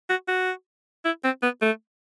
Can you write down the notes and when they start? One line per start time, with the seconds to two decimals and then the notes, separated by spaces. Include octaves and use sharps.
0.09 F#4
0.28 F#4
1.05 E4
1.24 C4
1.43 B3
1.62 A3